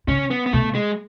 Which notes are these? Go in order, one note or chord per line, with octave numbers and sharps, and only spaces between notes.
C#3 C#4
B3
B3
B2 A3
G#3